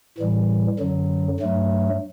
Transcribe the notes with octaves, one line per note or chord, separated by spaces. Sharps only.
A2 E3 G3
F#2 D3 F#3
G2 F#3 A3